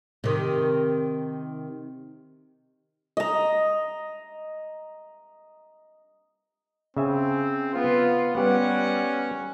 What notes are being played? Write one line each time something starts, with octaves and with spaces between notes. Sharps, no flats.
C3 D#3
D#5 A#5
C#3 C4 E5 G#5
B3 F4
G3 B3 C#4 G4 F#5